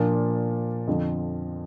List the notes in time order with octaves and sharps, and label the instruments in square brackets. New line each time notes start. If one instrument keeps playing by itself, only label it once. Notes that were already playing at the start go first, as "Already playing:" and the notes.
Already playing: [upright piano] A#2 F3 A#3 D4
F2 D3 F3